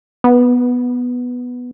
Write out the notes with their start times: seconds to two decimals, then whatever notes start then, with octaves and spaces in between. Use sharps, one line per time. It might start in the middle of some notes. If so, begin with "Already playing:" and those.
0.24 B3